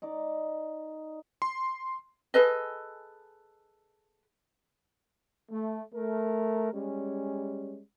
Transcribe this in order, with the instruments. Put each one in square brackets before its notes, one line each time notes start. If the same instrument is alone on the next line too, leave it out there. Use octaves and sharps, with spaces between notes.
[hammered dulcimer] D#4 D5 D6
[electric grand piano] C6
[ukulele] G#4 A4 B4 D#5
[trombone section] A3
A3 A#4
G3 G#3 C#4